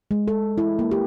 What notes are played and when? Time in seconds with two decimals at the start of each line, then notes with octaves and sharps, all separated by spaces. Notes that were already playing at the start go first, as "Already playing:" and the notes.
0.11 G#3
0.28 A4
0.58 E4
0.79 A#3
0.91 G4